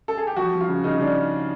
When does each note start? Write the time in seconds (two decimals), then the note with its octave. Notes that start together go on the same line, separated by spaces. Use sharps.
0.08 A4
0.17 G#4
0.27 G4
0.37 F3 F#4
0.53 F3
0.61 F4
0.68 C#3
0.84 C#3 D#4
1.01 C#3 D4